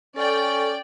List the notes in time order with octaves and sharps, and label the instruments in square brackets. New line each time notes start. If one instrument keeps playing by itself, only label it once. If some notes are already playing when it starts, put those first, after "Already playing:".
[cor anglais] C#4 [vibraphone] A4 [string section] D5 G5